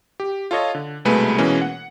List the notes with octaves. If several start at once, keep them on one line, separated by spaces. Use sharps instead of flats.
G4
F4 A4 C#5 D#5
D3
C2 B2 G#3 A3 B4 G#5
B2 E3 G#3 A#3 C#4
F#5